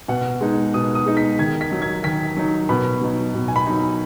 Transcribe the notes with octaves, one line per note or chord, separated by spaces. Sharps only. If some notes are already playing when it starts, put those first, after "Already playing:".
B2 F#5
G#3 D#4
B2 D#6
D#6
G#3 D#4
B6
D#3 G#6
B6
F#3 D#4
G#6
D#3 B6
F#3 D#4
B2 B5
F#3 D#4
B2
G#5
B5
F#3 D#4